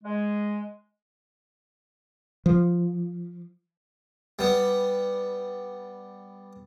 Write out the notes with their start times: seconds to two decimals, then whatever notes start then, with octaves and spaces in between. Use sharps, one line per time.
0.03 G#3
2.46 F3
4.39 G3 B3